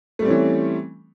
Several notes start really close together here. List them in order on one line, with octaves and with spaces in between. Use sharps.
A3 G3 C4 C#4 E3